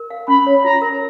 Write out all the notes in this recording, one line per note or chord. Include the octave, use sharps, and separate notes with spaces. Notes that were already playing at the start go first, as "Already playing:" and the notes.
Already playing: A#4
F5
C#4 B5
C#5
F4 A#5
A#4